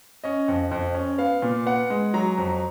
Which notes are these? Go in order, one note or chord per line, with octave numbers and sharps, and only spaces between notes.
C#4 D#5
F2
F2
C#4
B3 F5
A#2
B3 F#5
G#3
F#3 A#5
F2